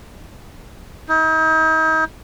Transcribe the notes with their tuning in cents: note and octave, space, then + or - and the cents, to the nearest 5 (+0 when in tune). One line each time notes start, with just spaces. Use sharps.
D#4 +40